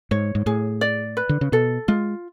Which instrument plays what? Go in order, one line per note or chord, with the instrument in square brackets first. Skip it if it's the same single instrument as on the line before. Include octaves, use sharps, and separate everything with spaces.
[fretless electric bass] G#2 [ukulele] C#5
[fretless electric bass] G#2
[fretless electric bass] A2 [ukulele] G#4
[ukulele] D5
B4
[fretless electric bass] D3
C#3
[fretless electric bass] B2 [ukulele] A4
[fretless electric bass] G#3 [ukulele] F4